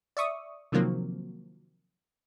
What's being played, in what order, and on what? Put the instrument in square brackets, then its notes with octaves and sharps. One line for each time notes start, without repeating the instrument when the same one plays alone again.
[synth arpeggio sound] D5 E5 C#6 D#6
C3 D#3 F3 F#3 A#3 C4